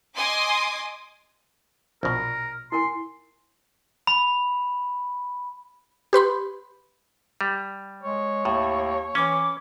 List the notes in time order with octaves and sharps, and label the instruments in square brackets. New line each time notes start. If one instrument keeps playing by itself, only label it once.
[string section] D#5 G#5 C6 D6 D#6
[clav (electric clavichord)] A#1 B2 [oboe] A#4
[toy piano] E4 A#4 G#5 [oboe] C6
[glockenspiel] B5
[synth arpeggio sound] G4 B4 B5 C6
[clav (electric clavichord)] G3
[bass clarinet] G#3 [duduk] C#5
[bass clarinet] D#2 [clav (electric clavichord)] A2
[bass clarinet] E3 [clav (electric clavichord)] C#4 [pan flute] D6